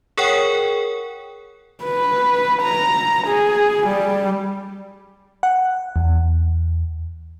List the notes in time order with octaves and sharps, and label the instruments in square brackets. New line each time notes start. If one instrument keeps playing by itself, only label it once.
[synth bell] G#4 A#4 C#5 F#5 G5
[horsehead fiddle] B4
A#5
G#4
G3
[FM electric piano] F#5
E2